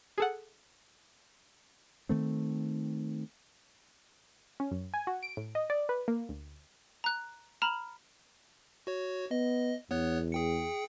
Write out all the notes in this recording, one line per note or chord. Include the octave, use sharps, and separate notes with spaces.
G#4 A4 F#5
D#3 A3 C4
C#4
F#2
G#5
F#4
D7
A2
D#5
D5
B4
A#3
D2
A#5 F#6
A#5 B5 F6 E7 F#7
F#4 C#5
B3 D#5
E2 B3 C#5 F#6
G#4 G5 C#7